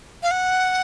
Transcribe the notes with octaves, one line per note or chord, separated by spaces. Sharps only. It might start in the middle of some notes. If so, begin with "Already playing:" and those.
F5
F#5